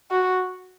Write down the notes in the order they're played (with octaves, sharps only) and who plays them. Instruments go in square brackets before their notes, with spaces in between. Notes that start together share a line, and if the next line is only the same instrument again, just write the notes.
[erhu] F#4